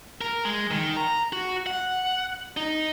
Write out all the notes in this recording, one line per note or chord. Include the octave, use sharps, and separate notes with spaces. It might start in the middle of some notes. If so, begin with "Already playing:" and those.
A#4
G#3
D#3
A#5
F#4
F#5
D#4